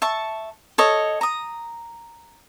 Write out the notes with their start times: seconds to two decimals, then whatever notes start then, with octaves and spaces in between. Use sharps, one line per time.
0.02 E5 A5 C#6
0.78 A4 C#5 D#5
1.21 A#5 D#6